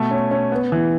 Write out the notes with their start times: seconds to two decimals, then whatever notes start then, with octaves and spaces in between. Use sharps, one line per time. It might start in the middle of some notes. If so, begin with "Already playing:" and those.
Already playing: B2 A3
0.11 C#4
0.31 C#4
0.52 B3
0.72 E3